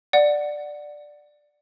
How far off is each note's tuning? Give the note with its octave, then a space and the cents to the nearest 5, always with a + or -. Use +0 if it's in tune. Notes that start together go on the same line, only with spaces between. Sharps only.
D5 +5 F#5 +0